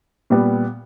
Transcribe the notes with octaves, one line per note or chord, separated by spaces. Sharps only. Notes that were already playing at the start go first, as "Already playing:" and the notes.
A#2 G3 B3